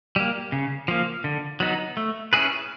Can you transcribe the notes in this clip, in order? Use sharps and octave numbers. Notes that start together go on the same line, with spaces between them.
G3 A#3
C#3
F3 A#3
D3
F#3 B3 D#4
A3
C#4 E4 G#4 B4